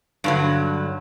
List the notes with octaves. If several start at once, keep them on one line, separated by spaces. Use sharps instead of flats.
G2 D3 F#3